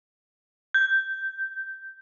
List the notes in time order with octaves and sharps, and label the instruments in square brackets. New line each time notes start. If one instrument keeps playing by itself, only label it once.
[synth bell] G6